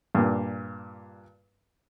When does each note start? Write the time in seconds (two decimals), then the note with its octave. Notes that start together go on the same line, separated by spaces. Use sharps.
0.15 G2 A#2